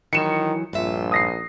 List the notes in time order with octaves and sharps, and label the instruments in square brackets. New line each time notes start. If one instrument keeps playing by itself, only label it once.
[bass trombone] D#3 [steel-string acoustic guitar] E3 F#3 [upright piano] C#7 E7
[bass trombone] A#1 [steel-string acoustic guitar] G2 F4 E5
[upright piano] D#6 A#6 C7